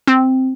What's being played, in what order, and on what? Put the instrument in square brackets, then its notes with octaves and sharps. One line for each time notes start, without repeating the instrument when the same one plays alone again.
[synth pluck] C4